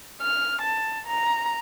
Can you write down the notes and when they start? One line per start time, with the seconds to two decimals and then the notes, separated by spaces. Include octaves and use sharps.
0.22 F6
0.62 A5
1.07 A#5